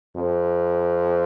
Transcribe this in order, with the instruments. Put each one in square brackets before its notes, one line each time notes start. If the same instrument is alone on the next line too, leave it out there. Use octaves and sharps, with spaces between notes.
[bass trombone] F2